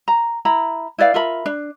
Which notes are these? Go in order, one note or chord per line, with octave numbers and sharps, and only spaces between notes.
A#5
E4 A#5 B5
E4 B4 D5 F5
F4 A#4 E5 B5
D4